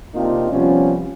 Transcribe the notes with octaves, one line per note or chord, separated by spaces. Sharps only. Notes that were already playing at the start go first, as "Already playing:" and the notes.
C3 A#3 C4 D4 D#4 F4
C3 F3 G3 B3 C#4